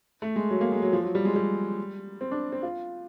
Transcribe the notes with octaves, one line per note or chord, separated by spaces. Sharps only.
A3
G#3
F#3
A#3
G#3
F#3
F3
F#3
G3
G#3
G3
C4
D4
C4
F4